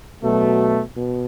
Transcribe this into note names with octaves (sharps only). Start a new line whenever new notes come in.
B2 F#3 A3
B2